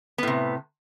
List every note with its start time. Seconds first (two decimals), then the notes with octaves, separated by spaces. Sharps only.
0.18 B3
0.23 A2
0.27 C3